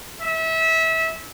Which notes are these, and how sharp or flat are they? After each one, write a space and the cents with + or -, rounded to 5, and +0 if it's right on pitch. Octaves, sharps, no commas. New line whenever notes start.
E5 -25